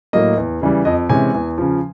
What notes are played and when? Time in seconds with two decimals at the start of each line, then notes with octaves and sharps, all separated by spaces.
0.13 A2 F#3 A#3 D#5
0.37 E2
0.62 C#3 E3 G3
0.85 F2 D#5
1.09 C3 E3 G#3 C#4 G#5
1.34 E2
1.58 C#3 F3